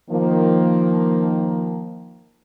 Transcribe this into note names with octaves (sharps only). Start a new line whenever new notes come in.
D#3 F3 A#3